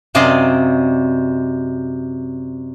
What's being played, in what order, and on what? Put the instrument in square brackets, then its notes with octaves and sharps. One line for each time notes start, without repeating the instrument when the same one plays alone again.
[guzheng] F#2 C3 D5 D#5 F5 C6